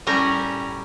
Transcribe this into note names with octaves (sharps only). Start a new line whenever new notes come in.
A2 G3 C#4 A#4 A#5